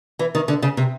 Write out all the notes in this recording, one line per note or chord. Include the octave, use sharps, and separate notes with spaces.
E3
D#3
D3
C#3
C3